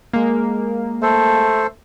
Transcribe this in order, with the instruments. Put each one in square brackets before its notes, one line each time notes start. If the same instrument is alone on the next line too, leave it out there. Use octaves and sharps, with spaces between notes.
[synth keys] G#3 A#3
[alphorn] A3 [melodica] A4 C5